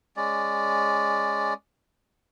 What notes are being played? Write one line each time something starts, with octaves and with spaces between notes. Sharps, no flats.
G#3 C#4 D5